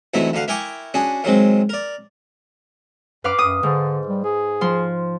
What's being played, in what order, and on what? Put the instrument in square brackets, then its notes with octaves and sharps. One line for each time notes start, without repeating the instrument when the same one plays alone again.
[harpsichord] E2 C3 F#3 A3 D#4 E4
D2 D3 F5 F#5
E4 A#4 G5 G#5 C#6 D6
C#4 D4 F#4 G#4
D#3 F#3 G#3 C4
A#4 D5
[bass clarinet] F#2 [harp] B4 F5 D6
[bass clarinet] F#2 [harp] D#6
[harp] G#2 [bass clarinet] D3
[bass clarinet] G3
G#4
[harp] F3 C6